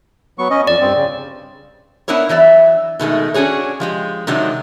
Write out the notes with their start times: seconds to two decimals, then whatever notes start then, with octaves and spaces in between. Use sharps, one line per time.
0.38 F#3 B3 C#6
0.50 C#4 D#5
0.67 F2 D5
0.81 G2 C4
0.96 C#3
2.08 B3 D4 E4 A#4 C#5
2.29 E3 F#3 D5 E5
2.99 B2 D#3 G#3 A3
3.34 C#4 D4 F#4 G#4 C#5
3.80 F3 G#3 G4
4.27 C3 D#3 F#3 G#3 D4